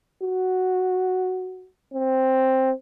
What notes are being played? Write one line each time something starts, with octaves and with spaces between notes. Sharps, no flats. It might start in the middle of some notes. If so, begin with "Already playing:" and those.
F#4
C4